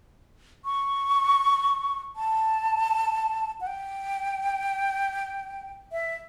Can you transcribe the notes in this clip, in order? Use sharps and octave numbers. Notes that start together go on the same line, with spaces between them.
C#6
A5
F#5
G5
E5